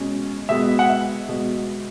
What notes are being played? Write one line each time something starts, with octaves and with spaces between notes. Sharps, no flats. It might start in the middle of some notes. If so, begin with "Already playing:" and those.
Already playing: B2 G#3 C#4
B2 G#3 B3 E5
F#5
E5
B2 G#3 B3